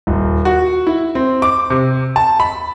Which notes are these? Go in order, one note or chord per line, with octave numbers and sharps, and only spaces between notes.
D#1
F#4
E4
C4
D6
C3
A5
B5